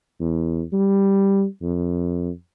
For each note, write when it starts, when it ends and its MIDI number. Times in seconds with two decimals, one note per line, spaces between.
0.20 0.62 40
0.73 1.45 55
1.62 2.29 41